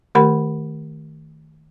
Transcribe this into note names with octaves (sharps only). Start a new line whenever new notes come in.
D#3 A3 G4 A#4 F#5 B5